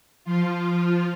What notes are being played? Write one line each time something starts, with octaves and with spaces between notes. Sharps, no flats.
F3 F4